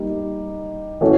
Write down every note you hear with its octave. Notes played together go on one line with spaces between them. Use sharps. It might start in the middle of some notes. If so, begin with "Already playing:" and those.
Already playing: G3 A#3 D#4 G4
A2 E3 A3 C#4 F#4